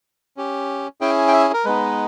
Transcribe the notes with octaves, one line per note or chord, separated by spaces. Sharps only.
C#4 G4
C#4 E4 G#4 G5
G5
E5
A#4
G#3 B3 D#4 B4